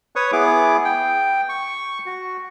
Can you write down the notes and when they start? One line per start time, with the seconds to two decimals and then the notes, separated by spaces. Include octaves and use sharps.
0.16 B4 C#5 C#6 D#6
0.32 B3 E4 G#4 D6
0.84 G5
1.49 C#6
2.06 F#4